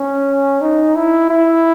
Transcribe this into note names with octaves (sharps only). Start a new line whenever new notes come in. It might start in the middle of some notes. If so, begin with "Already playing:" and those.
Already playing: C#4
D#4
E4
E4